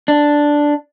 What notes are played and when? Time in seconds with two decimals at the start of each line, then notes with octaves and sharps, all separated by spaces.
0.08 D4